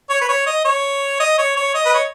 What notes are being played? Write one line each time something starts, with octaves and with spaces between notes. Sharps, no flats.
C#5
B4
C#5
D#5
C#5
D#5
C#5
C#5
D#5
B4
C#5